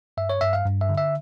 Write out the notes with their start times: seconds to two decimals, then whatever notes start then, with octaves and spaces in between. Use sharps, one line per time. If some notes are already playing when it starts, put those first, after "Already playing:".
0.17 G2 E5
0.30 C#5
0.41 G2 E5
0.53 F5
0.65 G2
0.81 E5
0.89 D3
0.98 E5